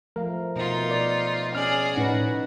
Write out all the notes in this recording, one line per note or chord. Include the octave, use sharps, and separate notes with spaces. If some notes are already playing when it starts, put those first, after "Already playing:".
F3 A3 A#4 F5
B2 D#4 F4
D5
C#4 G#4 D5 F6
A2 C#4 D#4 F#4 B4